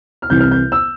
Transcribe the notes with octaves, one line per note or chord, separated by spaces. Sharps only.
F6
C2 C3 E3 G6
F6
G6
E6